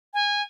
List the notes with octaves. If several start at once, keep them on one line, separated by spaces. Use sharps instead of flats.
G#5